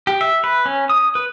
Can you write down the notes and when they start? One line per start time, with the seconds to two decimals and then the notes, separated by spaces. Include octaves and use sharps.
0.07 G4
0.21 E5
0.44 B4
0.66 C#4
0.90 D#6
1.15 B4